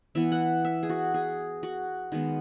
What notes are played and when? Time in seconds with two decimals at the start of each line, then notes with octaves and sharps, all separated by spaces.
0.15 E3 B3 E5
0.32 F#5
0.65 E5
0.83 G#4
0.89 F#4
1.14 G#4
1.63 F#4
2.12 D#3 G#3 B3